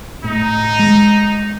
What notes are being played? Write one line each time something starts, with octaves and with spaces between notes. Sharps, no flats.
A2 D#4
G#3